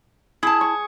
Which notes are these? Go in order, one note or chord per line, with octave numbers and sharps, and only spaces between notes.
E4 G#4 A5
C#6